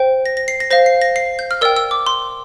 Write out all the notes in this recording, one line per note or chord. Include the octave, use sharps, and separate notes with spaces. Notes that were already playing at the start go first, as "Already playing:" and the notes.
Already playing: C5 G5
A#6
A#6
C7
A#6
C5 F5 A#6
C7
A#6
C7
G6
F6
A#4 D5 G5 E6
E6
D6
C6